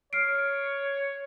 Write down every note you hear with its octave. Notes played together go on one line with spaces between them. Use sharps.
C#5 F6 C7 D7